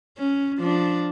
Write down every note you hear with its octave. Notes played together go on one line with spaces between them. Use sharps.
C#4
F3 D4